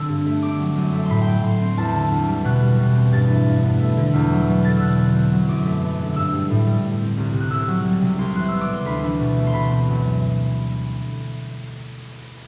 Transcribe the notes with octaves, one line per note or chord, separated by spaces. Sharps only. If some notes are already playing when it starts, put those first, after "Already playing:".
Already playing: D3 C4 E6
G2
A3
C4 D6
F#3
F#2
A3
C6
A2 B5
G5
F#3
A2 C6
C4
E2 A5
D3
E2
G3
B2 F#6
G3
B2
C4
G2 A6
E3
G2
B3
A3
D3
E2
F#3
B2
A3 A6
B2 E6 F#6
C4
C4
F#3
F#2 D6
A3
B3
D3
G2 E6
G3
A2
G3
A2
C4
C2
C3
F#6
C2 E6
F#3
G3
C3
C2 C6
E3 F#6
B3 E6
D6
C3
C6
D2 B5
E3
B2
A3
C6
B2 B5
C4
F#2